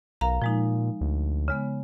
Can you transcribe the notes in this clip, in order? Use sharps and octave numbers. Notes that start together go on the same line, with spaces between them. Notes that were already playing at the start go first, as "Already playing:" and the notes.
B1 A#4 F5 A#5
A#2 F3 G#3 D#4
D2
C#3 G#3 B3